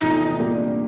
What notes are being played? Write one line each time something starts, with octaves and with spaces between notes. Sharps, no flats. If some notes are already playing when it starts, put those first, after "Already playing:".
E2 C3 F3 A3 D#4
A#2 G3 A#3 D4 G4